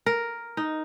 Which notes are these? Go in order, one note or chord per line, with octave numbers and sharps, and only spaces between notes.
A#4
D#4